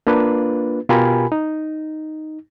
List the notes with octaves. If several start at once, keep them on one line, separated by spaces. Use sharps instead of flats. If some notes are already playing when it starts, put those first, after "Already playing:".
A#3 D4 F4 B4
B2 F4 G4 A#4 G#5 B5
D#4